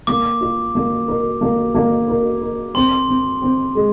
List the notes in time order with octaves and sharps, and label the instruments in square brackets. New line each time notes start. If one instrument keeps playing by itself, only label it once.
[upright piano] A#3 [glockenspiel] D6
[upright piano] F4
A#3
A#4
A#3
A#3
A#4
A#4
[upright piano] C4 [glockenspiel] C6
[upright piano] C4
C4
G#3